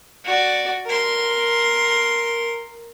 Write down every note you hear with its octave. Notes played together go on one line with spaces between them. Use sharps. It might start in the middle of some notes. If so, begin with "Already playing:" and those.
F#4 D5
A#4 C6